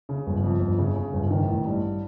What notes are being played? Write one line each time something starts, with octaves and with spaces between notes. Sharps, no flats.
C#3
G1
F2
G1
C#3
C#3
G1
D#3
A1
G2